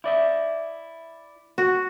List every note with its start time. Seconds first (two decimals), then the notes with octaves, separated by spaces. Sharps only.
0.04 E4 D5 E5
1.58 F#4